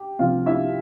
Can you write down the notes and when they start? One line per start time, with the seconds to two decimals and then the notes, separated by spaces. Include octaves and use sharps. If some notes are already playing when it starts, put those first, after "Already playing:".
Already playing: G4
0.19 C2 C3 F3 F4 F5
0.46 E4 E5